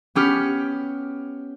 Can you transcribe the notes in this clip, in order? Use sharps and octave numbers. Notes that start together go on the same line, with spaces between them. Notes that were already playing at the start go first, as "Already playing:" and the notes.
B3 C#4 G4 F6 C#7